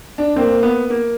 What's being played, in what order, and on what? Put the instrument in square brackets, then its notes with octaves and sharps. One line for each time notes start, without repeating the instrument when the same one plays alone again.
[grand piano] D4
[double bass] A#3 [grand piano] C4
[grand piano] B3
A#3